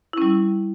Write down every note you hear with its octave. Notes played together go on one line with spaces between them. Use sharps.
G3 C#4 E4